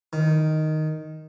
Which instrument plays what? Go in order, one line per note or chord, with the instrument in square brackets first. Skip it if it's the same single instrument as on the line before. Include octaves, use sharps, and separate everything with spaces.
[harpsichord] D#3